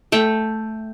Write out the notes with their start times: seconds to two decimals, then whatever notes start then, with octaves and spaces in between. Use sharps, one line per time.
0.12 A3 G5